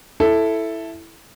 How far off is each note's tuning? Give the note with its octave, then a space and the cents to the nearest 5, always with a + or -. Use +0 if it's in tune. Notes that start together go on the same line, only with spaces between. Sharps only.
E4 +0 A4 +0